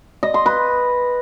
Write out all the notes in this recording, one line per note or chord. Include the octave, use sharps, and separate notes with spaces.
D#5
C6
B4